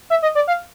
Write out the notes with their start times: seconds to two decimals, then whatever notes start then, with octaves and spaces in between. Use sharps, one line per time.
0.10 E5
0.22 D#5
0.35 D5
0.48 F5